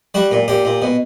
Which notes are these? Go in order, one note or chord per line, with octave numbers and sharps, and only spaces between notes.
G3 F#4
A#2
A#2 G4
A#2
B2